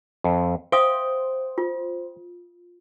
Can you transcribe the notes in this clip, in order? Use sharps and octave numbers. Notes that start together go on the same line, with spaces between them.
F2
C5 E5 F5 G5 D#6
F4